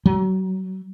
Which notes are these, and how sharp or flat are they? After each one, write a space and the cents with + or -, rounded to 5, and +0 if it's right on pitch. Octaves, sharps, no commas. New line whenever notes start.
F#3 +30